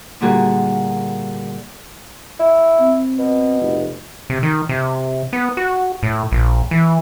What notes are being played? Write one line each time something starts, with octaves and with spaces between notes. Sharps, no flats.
A#2 D3 G3 A#3 F#4 G#4
E4
C4
B2
F1
C3
D#3
C3
B3
F#4
A2
A#1
E3